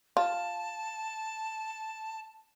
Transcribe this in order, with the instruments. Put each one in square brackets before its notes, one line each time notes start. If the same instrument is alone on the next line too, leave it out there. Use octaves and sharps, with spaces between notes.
[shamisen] F4 [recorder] A5